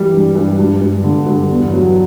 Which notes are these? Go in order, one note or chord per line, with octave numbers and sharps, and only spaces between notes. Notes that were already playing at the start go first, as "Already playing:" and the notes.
Already playing: E3 G3
G2
G2
G2
G2
D3
G2
E2
F#3